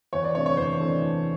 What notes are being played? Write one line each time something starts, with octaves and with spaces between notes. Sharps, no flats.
E2 C#5
D5
C3 E3 A3 D4 C#5
C#5
E2 C5
C3 E3 A3 D4
E2